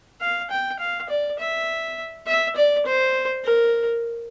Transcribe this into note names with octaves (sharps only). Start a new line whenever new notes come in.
F5
G5
F5
D5
E5
E5
D5
C5
A#4